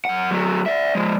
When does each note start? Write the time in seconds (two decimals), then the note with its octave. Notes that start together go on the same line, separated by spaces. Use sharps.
0.05 F#2 F#5
0.31 F#3 A3
0.66 D5 E5
0.95 F3 G#3